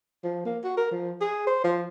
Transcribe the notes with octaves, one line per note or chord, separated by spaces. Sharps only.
F3
A#3
F#4
A#4
F3
G#4
C5
F3